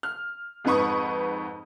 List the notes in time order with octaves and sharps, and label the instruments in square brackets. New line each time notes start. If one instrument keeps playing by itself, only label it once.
[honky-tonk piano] F6
F2 G#2 D#4 B4 C#6 D#6